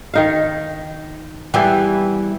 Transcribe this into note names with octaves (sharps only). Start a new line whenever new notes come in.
D#3 D#4 F5
E3 G3 B3 G4 G#4 E5